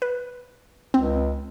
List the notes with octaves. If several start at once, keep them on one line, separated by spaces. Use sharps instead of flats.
B4
C#2 C4